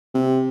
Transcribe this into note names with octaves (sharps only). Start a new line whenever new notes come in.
C3